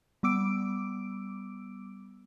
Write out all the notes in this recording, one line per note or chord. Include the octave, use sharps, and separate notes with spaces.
G3 B3 D6 E6 D7